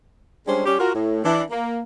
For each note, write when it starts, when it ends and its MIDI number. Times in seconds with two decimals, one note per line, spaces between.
0.46 0.65 55
0.46 0.65 56
0.46 0.65 61
0.46 0.65 62
0.46 0.65 68
0.46 0.65 72
0.66 0.77 55
0.66 0.77 61
0.66 0.77 67
0.79 0.90 65
0.79 0.90 66
0.79 0.90 70
0.94 1.20 45
1.24 1.42 52
1.24 1.42 62
1.50 1.81 58